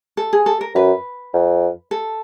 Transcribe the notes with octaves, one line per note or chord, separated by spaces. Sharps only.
A4
G#4
A4
A#4
F#2 B4
F2
A4